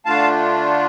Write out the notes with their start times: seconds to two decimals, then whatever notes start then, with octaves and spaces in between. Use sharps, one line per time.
0.06 D3 A3 D4 F4 F5 A5